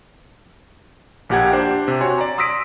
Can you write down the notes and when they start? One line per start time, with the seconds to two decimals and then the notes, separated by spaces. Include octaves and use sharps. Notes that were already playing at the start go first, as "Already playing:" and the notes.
1.29 A#1 A#2 G4 F#5 G#6
1.53 D4 G4 C5
1.88 C3
2.01 F#4 C#5 G#5 C6
2.18 D5 A#5
2.38 C6 D#6 E6 A#6 B6 D7